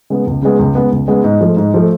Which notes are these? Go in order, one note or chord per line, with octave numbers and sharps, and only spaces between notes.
C#3 G#3 B3
C#2
C#3 G#3 B3
C#2
C#3 G#3 B3
C#2
C#3 G#3 B3
G#2
F3 A3
G#2
F3 A3